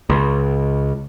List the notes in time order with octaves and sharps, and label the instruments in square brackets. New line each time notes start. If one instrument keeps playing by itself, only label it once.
[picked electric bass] C#2